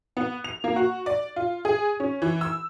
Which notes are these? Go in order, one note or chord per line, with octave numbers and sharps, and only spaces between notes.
B3
F7
A#3
F#4
D5
F4
G#4
C#4
E3
E6